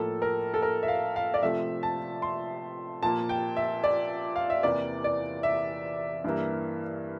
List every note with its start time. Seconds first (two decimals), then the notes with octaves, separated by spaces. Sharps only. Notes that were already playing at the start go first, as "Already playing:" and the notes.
Already playing: A2 F3 A#3 A4
0.22 A#4
0.54 A4
0.62 A#4
0.83 E5
0.88 F5
1.16 F5
1.34 D5
1.42 C3 F3 A3 E5
1.83 A5
2.22 C6
3.03 A#2 F3 A#3 A5
3.29 G5
3.56 E5
3.84 D5
4.36 F5
4.50 E5
4.63 E2 C3 E3 A#3 D5
5.04 D5
5.43 E5
6.24 G2 E3 A#3